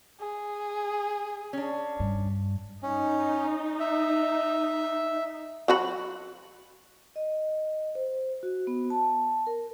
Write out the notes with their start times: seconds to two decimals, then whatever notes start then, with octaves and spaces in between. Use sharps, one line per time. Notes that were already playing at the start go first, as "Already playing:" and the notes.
0.20 G#4
1.53 C#4 D4
2.00 G2
2.83 C#4 D#4
3.80 E5
5.68 F#3 F#4 B5
7.16 D#5
7.95 C5
8.43 F#4
8.67 B3
8.90 A5
9.47 A#4